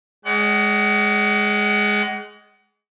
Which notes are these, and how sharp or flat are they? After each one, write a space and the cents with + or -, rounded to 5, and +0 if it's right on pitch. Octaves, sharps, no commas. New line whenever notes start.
G#3 +0 D5 -45 F#5 +35